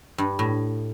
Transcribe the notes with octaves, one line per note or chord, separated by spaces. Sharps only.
G2
A2